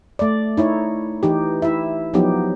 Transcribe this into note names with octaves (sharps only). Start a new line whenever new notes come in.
A3 D5
D#4 E4 C#5
E3 D#4 G4
E4 E5
F3 F#3 B3 D#4 G4